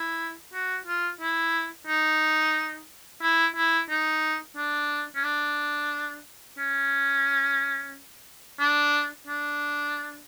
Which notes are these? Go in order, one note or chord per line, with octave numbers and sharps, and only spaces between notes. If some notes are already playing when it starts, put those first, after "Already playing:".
Already playing: E4
F#4
F4
E4
D#4
E4
E4
D#4
D4
C#4
D4
C#4
D4
D4